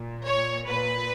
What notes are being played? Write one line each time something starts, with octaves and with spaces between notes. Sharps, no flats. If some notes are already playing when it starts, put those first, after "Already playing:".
Already playing: A#2
C#5
A#2 B4